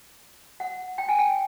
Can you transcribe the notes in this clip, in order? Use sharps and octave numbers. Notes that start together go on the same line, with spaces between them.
F#5
G5
G#5
G5